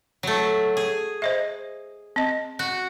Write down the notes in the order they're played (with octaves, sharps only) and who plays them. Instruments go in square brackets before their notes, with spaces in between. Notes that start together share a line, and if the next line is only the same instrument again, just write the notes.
[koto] F#3 A3
G#4
[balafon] C5 D#5 E5
C4 D#5
[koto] F#4